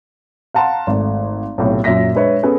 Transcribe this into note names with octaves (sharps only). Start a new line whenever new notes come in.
F5 F#5 A5 A#5 C6
G#1 A3
B1 A2 C3
F#2 A#2 E5 A#6 B6
G#3 D4 B4 C#5 E5
B3 C#4 G#4 A4